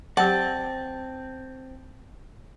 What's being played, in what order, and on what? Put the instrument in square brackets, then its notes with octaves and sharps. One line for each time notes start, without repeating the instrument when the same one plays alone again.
[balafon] F#3 G4 [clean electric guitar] C4 [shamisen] F#5 [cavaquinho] A5